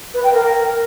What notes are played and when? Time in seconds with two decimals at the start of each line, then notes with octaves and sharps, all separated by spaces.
0.14 B4
0.24 G5
0.34 A#4